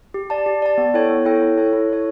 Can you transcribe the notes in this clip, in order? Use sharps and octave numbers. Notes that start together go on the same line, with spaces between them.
G4
D5 A5
G4
D5 A5
B3
E4 A4 C#5 G5
B3
E4 A4 C#5 G5
E4
A4 C#5
E4
A4 C#5